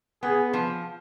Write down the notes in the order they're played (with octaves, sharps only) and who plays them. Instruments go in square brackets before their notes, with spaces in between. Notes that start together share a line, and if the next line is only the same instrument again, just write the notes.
[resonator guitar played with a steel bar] B3 [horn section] G#4
[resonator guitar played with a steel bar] F3